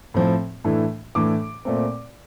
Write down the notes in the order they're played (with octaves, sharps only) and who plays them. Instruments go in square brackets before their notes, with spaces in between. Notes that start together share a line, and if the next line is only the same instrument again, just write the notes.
[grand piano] A2 F3 C4
A2 E3 A3 D4
A2 E3 A3 D4 D6
A#2 A3 C4